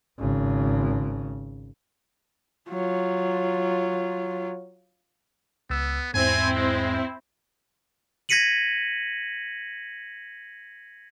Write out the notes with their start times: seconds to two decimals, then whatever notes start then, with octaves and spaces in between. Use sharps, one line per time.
0.20 G#1 C#3
2.69 F#3 F4
5.70 C#2 B3 E6
6.14 E2 G#2 C4 E4 C5 G#5
6.56 G#3
8.29 G#6 A#6 B6 C#7 D#7 F#7